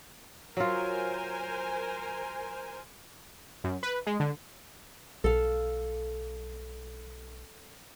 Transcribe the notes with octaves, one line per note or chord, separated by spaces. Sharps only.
F#3 F4 A#4 C5 G#5
F#2
B4
G#3
D3
B1 A4 F5